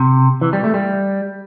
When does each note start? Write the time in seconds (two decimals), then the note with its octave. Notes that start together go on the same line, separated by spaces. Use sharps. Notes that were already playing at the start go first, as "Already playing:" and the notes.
Already playing: C3
0.41 E3
0.53 G3
0.64 A3
0.74 G3